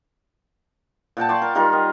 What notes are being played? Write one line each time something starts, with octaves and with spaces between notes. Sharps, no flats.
A#2 F#5 G5 A5
D5 C6 C#6
A#4
D#3 G3 F4 A#4
D#5